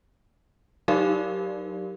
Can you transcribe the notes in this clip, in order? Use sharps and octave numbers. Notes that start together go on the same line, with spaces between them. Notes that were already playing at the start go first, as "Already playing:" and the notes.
F#3 D#4 G4 A#4 D5 F5